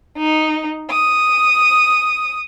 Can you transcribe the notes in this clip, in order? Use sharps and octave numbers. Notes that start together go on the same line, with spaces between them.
D#4
D#6